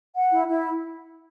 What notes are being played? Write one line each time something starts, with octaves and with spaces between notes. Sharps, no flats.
F#5
E4
E4